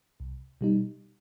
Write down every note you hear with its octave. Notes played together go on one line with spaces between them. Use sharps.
C2
B2 G3 D#4